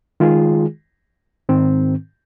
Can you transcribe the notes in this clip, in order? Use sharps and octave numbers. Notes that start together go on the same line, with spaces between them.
D#3 G#3 F4 G#4
G#2 D#3 C4